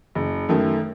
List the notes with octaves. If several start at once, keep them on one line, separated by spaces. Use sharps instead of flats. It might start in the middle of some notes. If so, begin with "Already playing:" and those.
F#1
F#2 D#3 A3